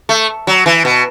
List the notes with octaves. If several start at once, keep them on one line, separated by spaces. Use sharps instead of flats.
A3
F#3
E3
B2